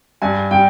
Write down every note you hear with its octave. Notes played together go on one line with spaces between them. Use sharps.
G2 G#5
G3 G5